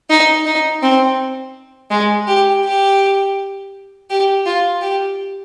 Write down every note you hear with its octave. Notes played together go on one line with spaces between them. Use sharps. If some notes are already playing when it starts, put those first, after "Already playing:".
D#4
D#4
C4
G#3
G4
G4
G4
F4
G4